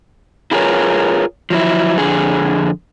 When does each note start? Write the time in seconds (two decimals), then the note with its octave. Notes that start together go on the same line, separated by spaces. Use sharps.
0.51 E4 F4 G#4 A#4 B4 C#5
1.50 F3 F#3 E4
1.98 F2 D3 G#4